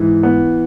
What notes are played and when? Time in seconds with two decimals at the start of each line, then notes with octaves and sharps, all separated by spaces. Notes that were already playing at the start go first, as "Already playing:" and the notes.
Already playing: G#2 E3
0.23 B3